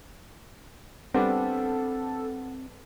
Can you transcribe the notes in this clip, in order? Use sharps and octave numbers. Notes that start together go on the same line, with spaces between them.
G3 B3 C4 D4 A4 F#5